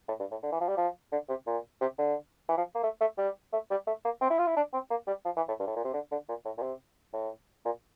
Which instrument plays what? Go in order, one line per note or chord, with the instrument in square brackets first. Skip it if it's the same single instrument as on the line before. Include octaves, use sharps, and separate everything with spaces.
[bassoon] A2
G2
A2
D3
E3
F3
G3
F3
D3
C3
A#2
C3
D3
E3
F3
A#3
A3
A3
G3
A3
G3
A3
A#3
C4
E4
F4
E4
D4
C4
A#3
G3
F3
E3
A2
G2
A2
A#2
C3
D3
D3
A#2
A2
A#2
C3
A2
A#2